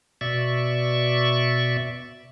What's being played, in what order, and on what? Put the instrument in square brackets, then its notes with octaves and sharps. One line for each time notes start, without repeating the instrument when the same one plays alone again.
[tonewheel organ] B2 D5 E5 C#6